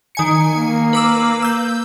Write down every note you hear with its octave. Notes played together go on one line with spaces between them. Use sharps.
D#3 G#5 C#7
A#3
B4 D6 E6
E6 G6